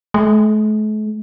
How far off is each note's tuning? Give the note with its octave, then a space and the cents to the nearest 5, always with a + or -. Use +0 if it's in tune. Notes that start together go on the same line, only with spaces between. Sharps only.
A3 -45